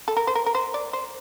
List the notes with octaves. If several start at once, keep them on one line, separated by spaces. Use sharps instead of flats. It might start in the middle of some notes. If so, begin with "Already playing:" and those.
A4
A#4
C5
A#4
A#4
C5
D5
C5